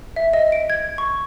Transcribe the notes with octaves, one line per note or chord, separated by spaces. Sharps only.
E5
D#5
D7
G#6
C#6